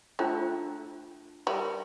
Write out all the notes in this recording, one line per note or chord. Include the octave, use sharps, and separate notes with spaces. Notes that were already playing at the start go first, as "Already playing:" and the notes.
A3 D4 F4 C5 G5 A#5
G3 A#4 E5 G5